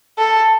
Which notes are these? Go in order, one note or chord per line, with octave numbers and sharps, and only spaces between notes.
A4